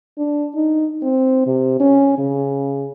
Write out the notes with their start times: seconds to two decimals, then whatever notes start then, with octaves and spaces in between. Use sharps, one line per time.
0.18 D4
0.56 D#4
1.03 C4
1.47 C3
1.80 C#4
2.18 C#3